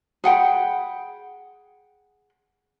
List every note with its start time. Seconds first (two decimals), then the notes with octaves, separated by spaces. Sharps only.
0.24 G#4 F#5 G5 B5